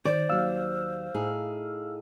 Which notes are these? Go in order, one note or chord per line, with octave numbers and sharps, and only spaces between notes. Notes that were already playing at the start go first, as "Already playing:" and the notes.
D#3 C5 D5
D#2 F#3 F5 E6 F6
A2 D#4 G#4